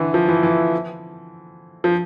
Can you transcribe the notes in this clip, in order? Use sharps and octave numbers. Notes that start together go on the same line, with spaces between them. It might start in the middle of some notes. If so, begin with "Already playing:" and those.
Already playing: D3 E3
F3
E3
E3
F3